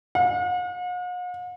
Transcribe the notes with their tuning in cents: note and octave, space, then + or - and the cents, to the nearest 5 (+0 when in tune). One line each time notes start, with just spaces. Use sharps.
F#5 -45